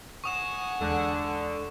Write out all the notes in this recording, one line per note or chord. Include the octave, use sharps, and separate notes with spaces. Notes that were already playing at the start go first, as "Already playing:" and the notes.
F#5 G#5 C#6 D#6 E7
E2 D3 G#3 F#6